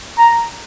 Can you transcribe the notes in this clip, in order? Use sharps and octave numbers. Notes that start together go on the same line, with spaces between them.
A#5